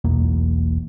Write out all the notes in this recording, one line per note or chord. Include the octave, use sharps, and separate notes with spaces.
E1 B1 E2 A#3